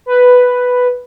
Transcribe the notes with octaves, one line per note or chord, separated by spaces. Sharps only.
B4